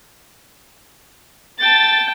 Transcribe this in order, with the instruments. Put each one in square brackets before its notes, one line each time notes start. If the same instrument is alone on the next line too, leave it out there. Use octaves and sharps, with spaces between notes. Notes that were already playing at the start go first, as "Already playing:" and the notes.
[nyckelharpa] G5 A5 [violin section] A6